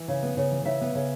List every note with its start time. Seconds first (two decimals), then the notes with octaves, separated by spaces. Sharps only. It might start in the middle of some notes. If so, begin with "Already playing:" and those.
Already playing: E3
0.08 C#3
0.23 B3
0.37 C#3
0.51 E3
0.65 C#3 E5
0.81 B3
0.95 C#3